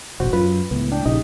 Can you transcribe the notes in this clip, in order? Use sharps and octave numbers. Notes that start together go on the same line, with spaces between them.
E1 A1 F#4 C5
F#2 F4 B4
C#2 A2 B3
D4 G5
A#1 C#3 D#4 G4 D#5